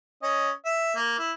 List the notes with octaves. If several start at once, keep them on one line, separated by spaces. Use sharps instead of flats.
C#4 D#5
E5
A#3
E4